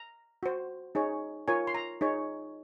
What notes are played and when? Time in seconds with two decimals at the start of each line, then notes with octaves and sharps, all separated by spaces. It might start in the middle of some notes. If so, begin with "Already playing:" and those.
Already playing: A#5
0.43 F#4 C5
0.95 D#4 G#4 C#5
1.48 F4 A#4 C#5 G#5
1.67 C6
1.75 A#5
2.01 D#4 G#4 C#5